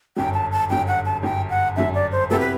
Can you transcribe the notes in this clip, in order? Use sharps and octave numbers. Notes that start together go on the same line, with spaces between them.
G1 F#2 F#3 G5
A5
A5
G1 F#2 F#3 G5
F#5
A5
G1 F#2 F#3 G5
F#5
G1 F#2 F#3 E5
D5
C5
C3 F#3 B3 E4 G4 A4
B4